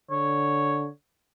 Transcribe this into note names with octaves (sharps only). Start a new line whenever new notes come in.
D3 C#5